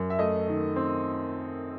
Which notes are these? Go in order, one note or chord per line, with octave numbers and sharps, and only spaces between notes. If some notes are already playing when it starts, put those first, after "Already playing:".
Already playing: F#2
E5
A3 D#5
D#3
C4